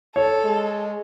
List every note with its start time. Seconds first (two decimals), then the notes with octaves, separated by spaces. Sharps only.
0.16 A4 C#5
0.44 G#3